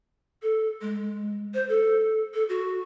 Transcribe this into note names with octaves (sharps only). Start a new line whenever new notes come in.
A4
G#3
C5
A4
A4
F#4